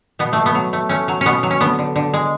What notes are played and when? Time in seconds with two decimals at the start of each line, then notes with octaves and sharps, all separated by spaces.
0.19 B2 B3
0.33 B2 A3
0.46 B3
0.55 F#3
0.73 A3
0.89 A3 C#4
1.08 F#3
1.21 B2 B3 C#4
1.43 F#3
1.51 C#4
1.60 D3 B3
1.79 D3
1.96 D3
2.14 G#3